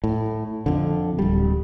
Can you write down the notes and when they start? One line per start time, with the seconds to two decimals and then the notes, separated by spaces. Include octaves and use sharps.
0.04 A2
0.66 F2 D3
1.19 D1 G3